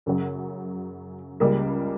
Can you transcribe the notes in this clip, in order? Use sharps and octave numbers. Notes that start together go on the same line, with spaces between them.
F#2 C#3 F#3
C#2 C#3 G3 A#3